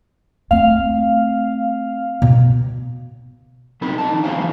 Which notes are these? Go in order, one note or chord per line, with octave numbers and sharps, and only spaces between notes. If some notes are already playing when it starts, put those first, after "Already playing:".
A3 C4 F5
B2
B2 F#3 C4 D#4 A#4 B5
D#5 A5
E3 A#3 D4 D#4
B3 F#4 C5 C#5 F5 G#5
E3 F3 G3 A3 C4 C#4